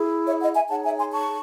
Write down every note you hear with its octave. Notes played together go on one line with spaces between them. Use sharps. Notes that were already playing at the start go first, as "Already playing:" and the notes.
Already playing: E4 G#4
C#5 E5
D#5 F#5
E5 G#5
D#4 G#4 C#5 F#5 A5
E5 G#5
G#5 C6
A5 C#6